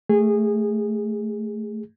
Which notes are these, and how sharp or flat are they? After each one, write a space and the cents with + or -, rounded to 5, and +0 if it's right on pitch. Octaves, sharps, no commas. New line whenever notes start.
A3 +0 G#4 -20